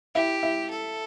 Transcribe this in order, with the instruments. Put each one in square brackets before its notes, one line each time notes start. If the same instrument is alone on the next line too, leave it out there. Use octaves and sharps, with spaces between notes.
[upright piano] E4 [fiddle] G4
[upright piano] E4
[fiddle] A4